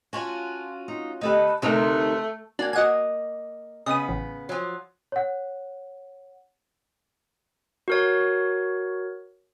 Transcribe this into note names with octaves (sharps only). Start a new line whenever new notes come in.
C#4 F4 F#4 G#5 A5
D#4
D2 D#4 G4 A4 B4
D2 C3 E3 A3 D#4 A#4
A#3 D4 F#4 G#5
A#3 F#4 D#5 F#5 G#5
C#3 B3 D#5 D#6
A1
F3 F#3
C#5 F#5
F#4 A#4 C#5